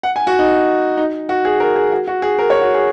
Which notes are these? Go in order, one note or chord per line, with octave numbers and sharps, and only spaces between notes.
F#5
G#5
F#4
D#4
D#4
F#4
G#4
A#4
G#4
F#4
F#4
G#4
A#4
C#5
F#4
G#4